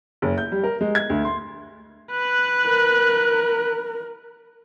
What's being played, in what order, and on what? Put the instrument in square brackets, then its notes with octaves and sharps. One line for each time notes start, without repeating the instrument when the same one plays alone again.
[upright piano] F#1
G6
G3
A#4
G#3
G#6
D2
C6
[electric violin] B4 F#6
[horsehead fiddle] A#4